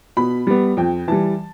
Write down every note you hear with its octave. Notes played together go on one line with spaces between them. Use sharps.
B2 B5
G3 B3
F2 G5
E3 G3 A5